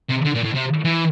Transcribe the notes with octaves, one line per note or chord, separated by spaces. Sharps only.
C3
D3
A#2
A2
C3
E3